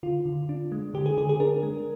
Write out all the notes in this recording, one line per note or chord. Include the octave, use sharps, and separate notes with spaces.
D3 F4
D3
D4
G#3
D3 G4
G#4
D3 G#4
G#4
D4 A#4
G#3